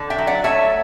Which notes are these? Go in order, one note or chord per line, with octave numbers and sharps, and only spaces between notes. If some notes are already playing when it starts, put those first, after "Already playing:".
Already playing: D3
E5 G5
F#3
D5 F#5
A3 C#5 E5